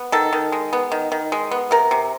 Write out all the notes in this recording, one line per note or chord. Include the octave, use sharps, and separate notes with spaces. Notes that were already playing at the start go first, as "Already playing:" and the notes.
Already playing: B3
D#3 A4
D#3
G#3
B3
D#3
D#3
G#3
B3
C3 A#4
C3